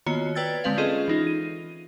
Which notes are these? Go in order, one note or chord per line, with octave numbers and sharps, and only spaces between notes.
D#3 A#3 B3 F4 F#4 C#5
B4 D5 G5 E6 G#6 A6
D3 G#3 C4 B4 F5
C#4 F4 G#4 A4 D#5
E3 D#4 F4
D#7